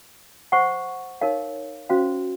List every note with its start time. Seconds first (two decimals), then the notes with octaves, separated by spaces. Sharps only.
0.52 C5 F#5 C#6
1.21 D#4 A#4 C#5 F5
1.89 C#4 F#4 C5 F5